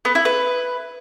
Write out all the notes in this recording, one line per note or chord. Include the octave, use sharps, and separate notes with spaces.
B3
E4
B4